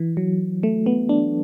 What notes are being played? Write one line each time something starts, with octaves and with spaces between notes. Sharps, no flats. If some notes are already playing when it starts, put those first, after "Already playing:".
Already playing: E3
F#3
A3
B3
D4